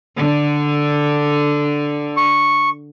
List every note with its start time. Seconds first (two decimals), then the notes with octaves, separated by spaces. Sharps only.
0.18 D3
2.17 C#6